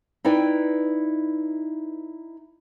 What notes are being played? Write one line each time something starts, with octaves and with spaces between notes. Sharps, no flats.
D#4 E4 B4 D5 G5